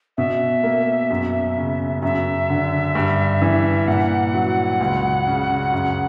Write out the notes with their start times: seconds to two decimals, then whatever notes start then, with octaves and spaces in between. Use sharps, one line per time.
0.17 B2 E5
0.64 A#3
1.11 F#2
1.57 C#3
2.02 F#2 E5
2.50 D3
2.95 G2
3.42 E3
3.88 A#2 F#5
4.34 F#3
4.81 C#2
5.27 C#3
5.72 F#2